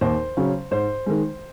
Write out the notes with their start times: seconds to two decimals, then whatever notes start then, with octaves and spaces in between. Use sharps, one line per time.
0.01 D#2 C5
0.37 C#3 F#3 C#4
0.71 G#2 C5
1.06 D#3 G#3